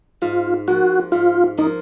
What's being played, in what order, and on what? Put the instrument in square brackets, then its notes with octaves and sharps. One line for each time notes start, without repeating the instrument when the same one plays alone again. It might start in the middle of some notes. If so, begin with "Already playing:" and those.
[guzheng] G#2 [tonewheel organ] F4
[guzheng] F3 A#3 [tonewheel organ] F#4
[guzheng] G#2 [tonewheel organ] F4
[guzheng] F3 A#3 [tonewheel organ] D#4